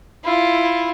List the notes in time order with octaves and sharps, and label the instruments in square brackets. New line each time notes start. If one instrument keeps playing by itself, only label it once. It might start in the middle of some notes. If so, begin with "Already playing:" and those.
[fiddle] E4 F4